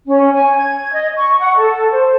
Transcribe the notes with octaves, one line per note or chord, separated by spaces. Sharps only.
C#4
G#5
G#6
D#5
C#6
F#5
A4
C5